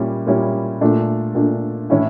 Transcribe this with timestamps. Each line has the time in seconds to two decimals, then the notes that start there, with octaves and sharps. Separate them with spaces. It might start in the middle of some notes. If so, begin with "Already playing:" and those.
Already playing: A#2 G3 C#4 E4
0.27 A#2 G3 C#4 E4
0.81 A#2 A3 D4
1.35 A#2 A3 D4
1.90 A2 E3 A3 C#4 E4